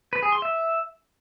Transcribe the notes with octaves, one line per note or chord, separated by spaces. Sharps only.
B4
G#4
C6
E5